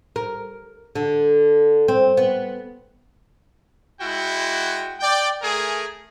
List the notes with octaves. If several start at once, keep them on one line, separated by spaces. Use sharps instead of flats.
A#4
D3
C4
B3
G#3 E4 F#4 G5
D5 G5
A3 G#4 A#4 G#5